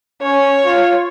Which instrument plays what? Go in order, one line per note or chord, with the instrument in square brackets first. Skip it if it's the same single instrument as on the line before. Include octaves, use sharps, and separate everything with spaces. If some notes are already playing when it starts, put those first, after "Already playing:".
[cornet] C#4 [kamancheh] C#5
[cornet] F4